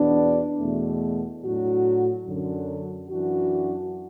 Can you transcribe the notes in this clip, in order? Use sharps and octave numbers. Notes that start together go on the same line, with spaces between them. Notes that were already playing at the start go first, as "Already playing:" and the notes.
Already playing: E2 B2 B3 D4
E2 B2 A3
A2 F#3 D4 F#4
F#2 D3 F#3
F#2 E3 D4 F#4